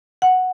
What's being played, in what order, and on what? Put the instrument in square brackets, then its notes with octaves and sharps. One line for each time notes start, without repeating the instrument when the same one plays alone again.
[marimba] F#5